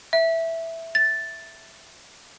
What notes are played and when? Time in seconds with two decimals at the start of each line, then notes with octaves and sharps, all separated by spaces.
0.13 E5
0.95 A6